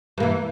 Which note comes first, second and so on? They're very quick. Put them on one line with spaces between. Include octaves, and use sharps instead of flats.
G2 A#3 E3